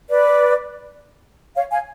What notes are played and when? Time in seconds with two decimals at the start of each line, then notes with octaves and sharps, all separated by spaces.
0.08 B4 D5
1.55 C#5 F5
1.71 F5 G#5